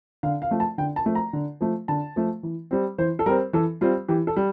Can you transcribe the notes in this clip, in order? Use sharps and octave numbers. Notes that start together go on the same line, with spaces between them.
D3 F5
F5
F3 A3
A5
D3 G5
A5
F3 A3
A#5
D3
F3 A3
D3 A5
F3 A3
E3
G3 C4
E3 C5
A4
G3 C4 A#4
E3 A4
G3 C4 F4
E3 G4
A4
G3